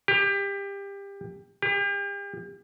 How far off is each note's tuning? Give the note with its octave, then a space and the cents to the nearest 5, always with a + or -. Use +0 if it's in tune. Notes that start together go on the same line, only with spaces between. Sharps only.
G4 +25
G4 +40